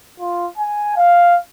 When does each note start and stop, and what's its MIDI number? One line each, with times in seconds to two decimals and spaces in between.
0.20 0.46 65
0.58 0.93 80
0.96 1.36 77